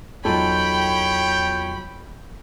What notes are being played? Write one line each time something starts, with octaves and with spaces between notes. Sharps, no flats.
E2 F#3 D#4 F4 A4 C#5 G5 B5